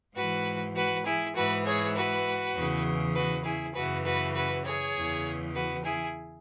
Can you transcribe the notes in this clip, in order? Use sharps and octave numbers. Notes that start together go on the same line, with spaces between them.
G#2 E3 F#4 B4
F#4 B4
E4 G#4
G#2 E3 F#4 B4
G#4 C#5
F#4 B4
E2 C#3 E3
F#4 B4
E4 G#4
F#2 C#3 E3 F#4 B4
F#4 B4
F#4 B4
G#4 C#5
E2 C#3 E3
F#4 B4
E4 G#4